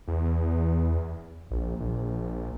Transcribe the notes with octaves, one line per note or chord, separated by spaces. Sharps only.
E2
A#1
A#1